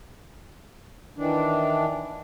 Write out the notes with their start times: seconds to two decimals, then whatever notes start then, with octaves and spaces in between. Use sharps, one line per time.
1.17 D#3 E3 D4